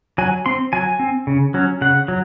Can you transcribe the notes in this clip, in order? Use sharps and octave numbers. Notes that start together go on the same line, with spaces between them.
F#3 G#5
C4 C6
F#3 G#5
C4
C#3
F#3 C#4
C#3 F#5
F#3